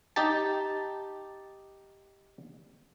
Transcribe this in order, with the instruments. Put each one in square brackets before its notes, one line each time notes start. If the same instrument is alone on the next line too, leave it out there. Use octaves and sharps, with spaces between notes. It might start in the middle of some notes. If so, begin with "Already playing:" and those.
[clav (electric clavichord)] D#4 G4 A5